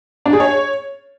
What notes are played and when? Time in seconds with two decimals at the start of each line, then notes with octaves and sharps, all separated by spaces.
0.26 D4
0.33 G#4
0.40 C#5